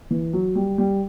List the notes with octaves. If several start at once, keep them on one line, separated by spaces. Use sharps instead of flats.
E3
F#3
G3
G3